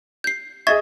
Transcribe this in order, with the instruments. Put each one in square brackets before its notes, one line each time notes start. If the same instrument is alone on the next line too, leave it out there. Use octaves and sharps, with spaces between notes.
[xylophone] G6 C7
[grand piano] G#4 D#5 E5 [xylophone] C#6 G#6 A6